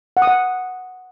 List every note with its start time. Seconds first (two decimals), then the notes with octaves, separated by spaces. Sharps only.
0.17 F#5
0.22 D#6
0.27 F#5